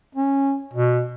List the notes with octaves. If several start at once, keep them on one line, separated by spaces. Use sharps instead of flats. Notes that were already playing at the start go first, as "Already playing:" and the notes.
C#4
B2